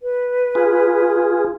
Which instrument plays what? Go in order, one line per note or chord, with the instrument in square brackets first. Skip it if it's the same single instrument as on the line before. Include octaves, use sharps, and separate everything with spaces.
[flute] B4
[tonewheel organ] F4 G#4